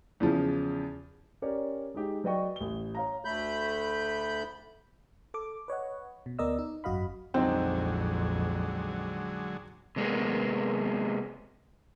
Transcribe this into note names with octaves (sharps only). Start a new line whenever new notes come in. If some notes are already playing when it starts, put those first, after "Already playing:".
E2 C#3 F3
C#4 G4 A#4 C#5 D5
G#3 D#4 G4
F#3 B4 D5 D#5 G5 C#6
A1 G7
C#5 F5 A#5
D2 A3 B5 G6
A4 D6
B4 C#5 D#5 F#5
B2
D2 B3 A#4 D5 D#5 E6
D#4
G#1 F#2 F#4 D#5 F5 B5
A#1 F2 D3 F#3 G#3 C4 D#4
C3 G#3 A#3 B3